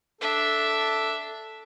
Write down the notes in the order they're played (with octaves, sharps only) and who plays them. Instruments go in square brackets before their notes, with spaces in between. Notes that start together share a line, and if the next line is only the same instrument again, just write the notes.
[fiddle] D4 E5 [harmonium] A4